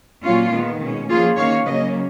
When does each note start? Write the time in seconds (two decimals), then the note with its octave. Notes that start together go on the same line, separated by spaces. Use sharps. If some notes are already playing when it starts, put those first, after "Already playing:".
0.23 A#2 F#3 A#3 C#4 F4
0.52 D#3 G#3 B3
0.80 B2 G#3 C#4
1.09 F3 A#3 C#4 F4 G#4
1.37 D#3 A#3 C#4 C#5 F5
1.66 C#3 F#3 A#3 C#4 B4 D#5